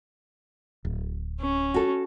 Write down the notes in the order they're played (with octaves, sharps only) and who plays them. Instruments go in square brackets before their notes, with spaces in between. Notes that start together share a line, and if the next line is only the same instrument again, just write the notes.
[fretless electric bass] D1
[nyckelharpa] C#4
[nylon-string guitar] F#4 A4